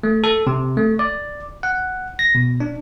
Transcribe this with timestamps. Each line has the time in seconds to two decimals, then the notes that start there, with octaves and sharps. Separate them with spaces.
0.03 A3
0.24 A4
0.47 C3
0.77 A3
0.99 D5
1.63 F#5
2.19 A#6
2.35 B2
2.60 D4